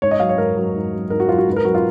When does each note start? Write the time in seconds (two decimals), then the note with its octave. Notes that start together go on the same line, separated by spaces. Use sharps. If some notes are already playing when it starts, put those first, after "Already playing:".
0.02 G#2 C#5
0.11 D#5
0.20 F#3 F5
0.29 C#5
0.38 G#2 A#4
0.56 F#3
0.75 G#2
0.93 F#3
1.10 G#2 A#4
1.20 F#4
1.29 F#3 F4
1.38 F#4
1.47 G#2 B4
1.56 A#4
1.65 F#3 F#4
1.75 F4